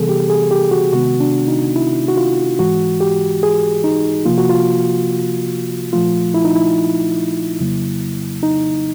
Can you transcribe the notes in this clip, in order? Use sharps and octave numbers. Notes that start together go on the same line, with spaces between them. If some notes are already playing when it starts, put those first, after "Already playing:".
Already playing: C3 E3 G3 B3 G#4 A4
G4
G#4
G4
F#4
C3 D#3 G#3 B3 F#4
D4
D#4
E4
F#4
F4
G#2 E3 G#3 F#4
G4
G#4
D#4
C3 F3 A#3 F4
F#4
F4
A#2 F3 A3 F4
E4
D#4
E4
F2 C#3 F#3 A#3
D#4